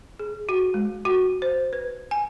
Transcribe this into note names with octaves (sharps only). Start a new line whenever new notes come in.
G#4
F#4
G#3
F#4
C5
B4
G#5